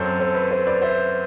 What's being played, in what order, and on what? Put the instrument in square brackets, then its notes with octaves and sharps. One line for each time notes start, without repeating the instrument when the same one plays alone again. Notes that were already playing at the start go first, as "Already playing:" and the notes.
Already playing: [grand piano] F#2 F#3 C4 A4 C5
A4 C5
B4
A4 C5
B4 D5
C5 E5